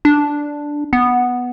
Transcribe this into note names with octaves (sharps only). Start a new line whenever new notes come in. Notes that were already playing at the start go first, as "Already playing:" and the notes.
D4
B3